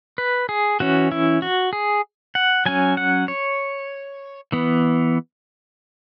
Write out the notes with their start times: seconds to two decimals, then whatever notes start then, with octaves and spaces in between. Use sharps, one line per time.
0.18 B4
0.49 G#4
0.80 E3 C#4 F#4
1.12 E4
1.42 F#4
1.73 G#4
2.35 F#5
2.66 F#3 C#4 G#5
2.97 F#5
3.28 C#5
4.52 E3 B3